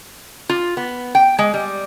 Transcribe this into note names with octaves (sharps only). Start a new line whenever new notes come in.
F4
B3
G5
G#3
G3